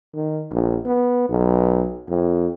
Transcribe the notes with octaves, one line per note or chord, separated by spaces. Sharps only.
D#3
A#1
B3
B1
F2